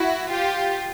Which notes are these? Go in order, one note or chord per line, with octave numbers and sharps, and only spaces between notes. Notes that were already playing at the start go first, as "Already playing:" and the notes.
Already playing: E4 F#4
F4 G4